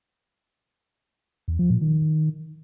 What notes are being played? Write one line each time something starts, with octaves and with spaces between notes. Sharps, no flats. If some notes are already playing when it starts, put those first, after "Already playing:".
E2
F3
A#2
D#3